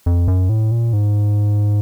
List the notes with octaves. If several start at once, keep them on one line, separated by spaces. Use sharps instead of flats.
F2
F#2
A2
A#2
G#2